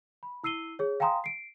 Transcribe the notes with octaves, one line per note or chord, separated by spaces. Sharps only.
B5
E4 E6 C7 D#7 G7
G#4 C#5
F5 G5 G#5 A#5 C6 D#6
C7 D7